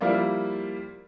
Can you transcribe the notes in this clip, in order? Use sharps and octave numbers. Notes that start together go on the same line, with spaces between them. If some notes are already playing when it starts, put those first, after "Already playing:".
F3 G3 A#3 E4 F4 D5